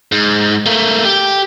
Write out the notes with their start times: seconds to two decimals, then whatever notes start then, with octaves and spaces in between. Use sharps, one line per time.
0.12 G#2
0.66 A3 A#3
1.05 G4